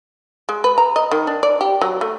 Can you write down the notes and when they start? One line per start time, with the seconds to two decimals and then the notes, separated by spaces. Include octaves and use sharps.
0.49 G#3
0.64 B4
0.78 A#5
0.96 D#5
1.11 D#3
1.27 D4
1.43 D5
1.61 G4
1.81 F#3
2.01 A3